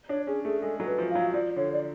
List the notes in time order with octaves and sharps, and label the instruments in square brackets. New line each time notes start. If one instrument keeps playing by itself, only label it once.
[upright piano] D4 [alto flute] C#5
[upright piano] C#4 [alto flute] G#4
[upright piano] A3 [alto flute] G#4
[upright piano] G#3 [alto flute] A4
[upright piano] F#3 [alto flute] A4
[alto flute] B4
[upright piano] F3
[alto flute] F5
[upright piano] F#3
[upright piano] F3 [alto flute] D5
[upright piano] D3 [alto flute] C#5
[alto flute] D5